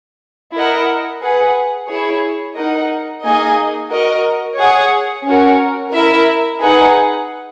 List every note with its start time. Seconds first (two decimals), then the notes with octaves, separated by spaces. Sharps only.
0.54 E4 A#4 D#5 F#5
1.21 G#4 B4 F#5
1.89 E4 G#4 C#5
2.56 D#4 A#4 D#5 F#5
3.23 A#3 D#4 G#4 D#5 G#5
3.91 F#4 A#4 D#5
4.58 G#4 C#5 F#5
5.25 C#4 F#4 A#4
5.93 E4 A#4 E5
6.60 D#4 G#4 B4 F#5